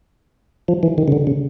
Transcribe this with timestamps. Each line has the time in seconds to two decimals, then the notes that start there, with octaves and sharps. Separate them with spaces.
0.68 F3
0.83 E3
0.98 D#3
1.08 C#3
1.12 D3
1.27 C#3